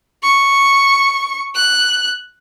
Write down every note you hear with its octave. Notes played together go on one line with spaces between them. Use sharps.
C#6
F#6